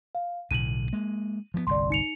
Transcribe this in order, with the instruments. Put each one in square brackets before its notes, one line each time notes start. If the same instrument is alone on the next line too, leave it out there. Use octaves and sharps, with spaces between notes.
[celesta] F5
[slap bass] B1 A2 D3 [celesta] D#7 F#7
[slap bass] G#3 A#3
F3 G3 B3
[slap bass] G1 C2 [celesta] D5 C6
[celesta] D#4 C#7 F7